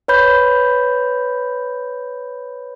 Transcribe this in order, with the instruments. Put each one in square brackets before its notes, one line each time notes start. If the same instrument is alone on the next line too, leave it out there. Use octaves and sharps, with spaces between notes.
[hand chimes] B4 C#5 B5 G6